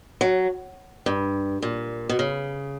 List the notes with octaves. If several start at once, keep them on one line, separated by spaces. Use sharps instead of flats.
F#3
G2
A#2
B2
C#3